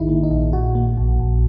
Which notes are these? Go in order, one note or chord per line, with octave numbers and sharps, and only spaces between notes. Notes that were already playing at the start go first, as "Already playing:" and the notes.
Already playing: A#1 G#2 D#3 D#4 E4 G#4
A#3
D#4
A#1
A#2 F#4
A#3
A#1
A#1